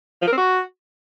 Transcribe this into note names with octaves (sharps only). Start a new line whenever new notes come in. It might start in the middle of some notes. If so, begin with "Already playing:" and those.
F3
A#4
C4
F#4